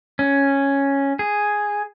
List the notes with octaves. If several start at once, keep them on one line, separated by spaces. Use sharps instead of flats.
C#4
G#4